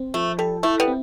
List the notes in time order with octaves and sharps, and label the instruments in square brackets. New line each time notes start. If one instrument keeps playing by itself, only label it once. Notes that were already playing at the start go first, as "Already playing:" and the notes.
Already playing: [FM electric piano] C4
[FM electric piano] F3 [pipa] A3
[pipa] G3 [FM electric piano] A4
[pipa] A3 [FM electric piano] E4
[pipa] G3 B3
[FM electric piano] C4